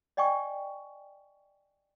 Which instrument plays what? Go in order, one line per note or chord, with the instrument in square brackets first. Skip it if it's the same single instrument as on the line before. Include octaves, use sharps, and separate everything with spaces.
[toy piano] D5 D#5 G5 G#5 C#6